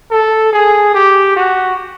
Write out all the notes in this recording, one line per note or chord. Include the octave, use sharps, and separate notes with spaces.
A4
G#4
G4
F#4